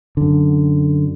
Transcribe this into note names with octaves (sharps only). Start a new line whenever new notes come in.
F#2 D3